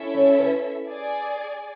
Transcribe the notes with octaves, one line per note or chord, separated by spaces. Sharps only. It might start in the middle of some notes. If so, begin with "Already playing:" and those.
Already playing: C#4 E4 A4 E5
C#5
B4
G#4 D5 G#5